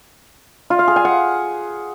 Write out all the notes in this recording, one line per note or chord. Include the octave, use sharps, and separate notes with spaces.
F4
F5
G#4
G#5
F#5